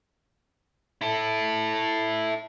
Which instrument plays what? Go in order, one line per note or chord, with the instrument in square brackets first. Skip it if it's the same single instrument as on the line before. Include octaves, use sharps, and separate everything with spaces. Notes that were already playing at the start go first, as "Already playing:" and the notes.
[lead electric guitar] E4 A4